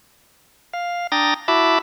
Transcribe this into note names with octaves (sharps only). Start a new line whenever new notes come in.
F5
D4 G5 A#5 D#6 A6 A#6
E4 F#4 E5 A5 B5 D6